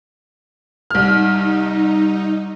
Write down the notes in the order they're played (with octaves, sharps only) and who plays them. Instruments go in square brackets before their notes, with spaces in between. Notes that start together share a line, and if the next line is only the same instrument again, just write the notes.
[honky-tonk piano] C2 F6 [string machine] D#4